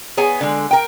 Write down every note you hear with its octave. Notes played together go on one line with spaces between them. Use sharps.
B3 G#4 C#5 G#5
D3 G#3
A#4 G5